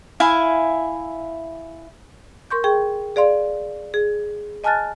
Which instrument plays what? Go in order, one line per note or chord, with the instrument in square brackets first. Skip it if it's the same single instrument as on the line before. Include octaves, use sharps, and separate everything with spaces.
[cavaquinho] E4 E5 F5 G#5
[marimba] A#4 C6 C#6 G6
G#4 G5 C#6
G#4 D5 F5 C6
G#4
D#5 G#5 A5 F6 F#6 A6